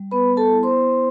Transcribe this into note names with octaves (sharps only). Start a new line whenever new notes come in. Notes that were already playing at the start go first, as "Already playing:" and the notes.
Already playing: G3
B3 B4 B5
A4 A5
E4
C5 C6
B3